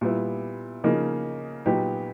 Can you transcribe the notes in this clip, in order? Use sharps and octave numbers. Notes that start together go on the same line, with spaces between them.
A#2 G3 B3 E4
C#3 F3 A#3 D#4
A#2 F#3 B3 D#4 G4